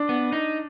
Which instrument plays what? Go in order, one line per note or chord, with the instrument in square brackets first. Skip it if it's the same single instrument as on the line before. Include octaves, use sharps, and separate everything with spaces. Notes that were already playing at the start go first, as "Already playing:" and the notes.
Already playing: [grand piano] D4
[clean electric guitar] B3
D#4